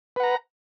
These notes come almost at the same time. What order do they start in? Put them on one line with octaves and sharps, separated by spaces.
B4 F#5 A#5